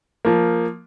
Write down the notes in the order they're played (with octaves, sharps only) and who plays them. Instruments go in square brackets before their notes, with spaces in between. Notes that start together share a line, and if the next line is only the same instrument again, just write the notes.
[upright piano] F3 A#3